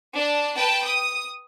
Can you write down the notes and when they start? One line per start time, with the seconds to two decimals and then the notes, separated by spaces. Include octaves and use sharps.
0.16 D4 A5
0.55 B4 G5 A5
0.86 D#6